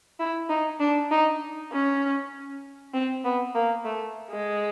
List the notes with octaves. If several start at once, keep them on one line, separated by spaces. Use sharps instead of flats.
E4
D#4
D4
D#4
C#4
C4
B3
A#3
A3
G#3